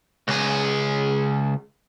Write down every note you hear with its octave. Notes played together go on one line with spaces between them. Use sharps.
C#2 G#4